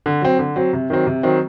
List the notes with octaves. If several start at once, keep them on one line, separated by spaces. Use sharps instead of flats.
D3
F#3 C4
D3
F#3 C4
C3
D#3 F#3 C4
C3
D#3 F#3 C4